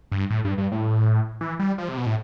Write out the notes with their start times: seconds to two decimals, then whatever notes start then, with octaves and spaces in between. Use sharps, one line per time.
0.12 G2
0.30 A2
0.45 G2
0.58 G2
0.72 A2
1.41 E3
1.59 G3
1.78 F3
1.89 C3
1.97 B2
2.06 A2